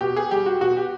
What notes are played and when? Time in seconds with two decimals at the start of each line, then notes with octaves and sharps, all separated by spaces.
0.01 B2 G4
0.16 G#4
0.31 G3 G4
0.46 F#4
0.61 B2 F#4
0.77 G4